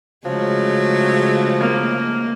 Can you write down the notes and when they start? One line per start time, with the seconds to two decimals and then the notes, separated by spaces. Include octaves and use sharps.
0.25 C#3 F3 F#3 G#3 A3
1.60 A#3